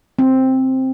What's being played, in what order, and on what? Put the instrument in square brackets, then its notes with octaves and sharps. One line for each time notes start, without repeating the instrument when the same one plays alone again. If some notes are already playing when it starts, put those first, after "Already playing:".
[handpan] C4